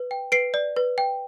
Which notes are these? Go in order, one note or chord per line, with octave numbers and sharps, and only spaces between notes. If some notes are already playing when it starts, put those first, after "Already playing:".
Already playing: B4
G5
B4 C7 D7
D5
B4
G5